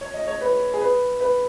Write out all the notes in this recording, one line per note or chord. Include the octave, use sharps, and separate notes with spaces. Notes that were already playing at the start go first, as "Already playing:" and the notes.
C#5
D#5
C#5
B4
G#4
B4
B4